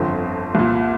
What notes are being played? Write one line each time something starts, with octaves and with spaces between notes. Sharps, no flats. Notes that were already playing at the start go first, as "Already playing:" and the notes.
Already playing: G1 F2 D3 C4
C2 A#2